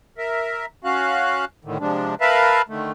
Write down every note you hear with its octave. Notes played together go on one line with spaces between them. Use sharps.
A#4 E5
C#4 F#4 F5 F#6
A2 D3 D#3
C3 F3 G#3 D4
A#4 B4 E5 F5 A5 B5
D3 D#3 A3